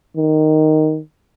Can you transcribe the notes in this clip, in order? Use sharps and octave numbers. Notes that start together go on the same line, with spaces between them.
D#3